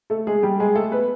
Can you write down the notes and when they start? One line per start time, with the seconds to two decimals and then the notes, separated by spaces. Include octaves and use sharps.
0.10 A3 A4
0.27 G#3 G#4
0.43 G3 G4
0.60 G#3 G#4
0.75 A3 A4
0.92 B3 B4